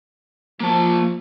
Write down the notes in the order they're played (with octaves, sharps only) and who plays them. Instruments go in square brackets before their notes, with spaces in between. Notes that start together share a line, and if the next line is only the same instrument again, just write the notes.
[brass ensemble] F3 [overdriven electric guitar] A#3 A5